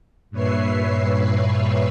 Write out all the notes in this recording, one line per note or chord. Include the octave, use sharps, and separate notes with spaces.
G2 A#2 B4 C#5 E5 C7